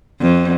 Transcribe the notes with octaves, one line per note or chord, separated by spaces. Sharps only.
F2